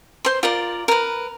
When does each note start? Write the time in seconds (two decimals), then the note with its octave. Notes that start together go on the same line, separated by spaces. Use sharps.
0.25 C5 C6
0.43 F4 A#4 D5
0.88 A#4 B4